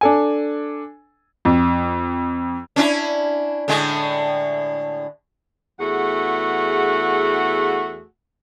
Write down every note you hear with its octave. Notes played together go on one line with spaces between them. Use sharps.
D4 A4 G#5
F2
C#4 D4 E4
A2 D3 G#3
E2 A3 F#4 G#4 F#5